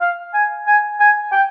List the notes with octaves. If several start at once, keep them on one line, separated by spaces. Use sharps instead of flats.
F5
G#5
G#5
G#5
G5